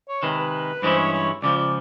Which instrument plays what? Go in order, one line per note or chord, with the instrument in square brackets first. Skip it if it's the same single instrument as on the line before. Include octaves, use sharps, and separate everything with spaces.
[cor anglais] C#5
[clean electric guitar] C3 D#3 G#3 [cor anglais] B4
[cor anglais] B4
[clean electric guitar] G2 E3 G#3 C#4 E4 [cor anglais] C5
[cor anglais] C#5
C#5
[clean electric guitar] C#2 C#3 F3 [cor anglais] D5
[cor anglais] D5